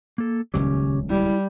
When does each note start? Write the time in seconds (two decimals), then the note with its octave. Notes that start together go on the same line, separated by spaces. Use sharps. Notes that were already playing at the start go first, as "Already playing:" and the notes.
0.18 A#3 A4
0.54 D#1 C#2 C#3 F#3 C#4 G4
1.10 G3 E4